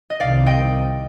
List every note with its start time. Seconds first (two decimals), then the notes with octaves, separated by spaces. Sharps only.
0.10 D#5
0.20 C2 C3 D#3 D5 F5
0.46 D#5 G5